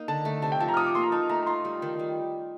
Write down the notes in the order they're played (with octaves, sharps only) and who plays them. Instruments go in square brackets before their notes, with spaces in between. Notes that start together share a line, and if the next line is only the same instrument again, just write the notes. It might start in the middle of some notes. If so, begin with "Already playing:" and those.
Already playing: [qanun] A#3 D#4
[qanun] D3 [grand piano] A5
[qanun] A3
[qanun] C3 [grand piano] A5
[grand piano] G5
[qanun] F3 [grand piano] A5
[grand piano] A#5
F6
[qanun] A4 [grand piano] D#6
[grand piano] D6
[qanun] A#3 [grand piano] C6
[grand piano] A#5
[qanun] D#4 [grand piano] A5
[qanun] A3 [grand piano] A#5
[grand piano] A#5
[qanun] F4 [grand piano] C6
[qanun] G3
D#3
G3